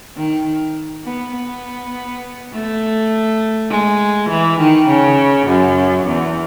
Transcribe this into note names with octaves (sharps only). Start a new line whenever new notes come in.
D#3
B3
B3
A3
G#3
E3
D#3
C#3
F#2
E2